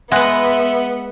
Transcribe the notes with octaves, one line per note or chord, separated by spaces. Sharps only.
G#3 B3 B4 E5 F#5